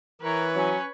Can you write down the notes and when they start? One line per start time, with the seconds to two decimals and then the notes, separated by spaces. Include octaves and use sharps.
0.22 E3 A#4 B4 C#5
0.55 F#3 C#4